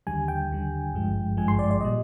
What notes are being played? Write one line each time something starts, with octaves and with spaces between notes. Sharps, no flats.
D#2 D3 G3 G#5
G5
D#2 D3 G3
G#1 G2 F3 G#3
G#1 G2 F3 G#3 G#5
C6
D5
D5
A#2 G3 D#5